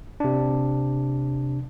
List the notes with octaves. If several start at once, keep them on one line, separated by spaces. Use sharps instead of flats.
C3 D4